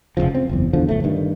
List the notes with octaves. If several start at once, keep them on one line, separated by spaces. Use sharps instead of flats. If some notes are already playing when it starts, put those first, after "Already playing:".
F1 A#1 C#3 F3
C4
F#1 E2
E2 D3 F3
D1 G1 A2 A3
G2 D#3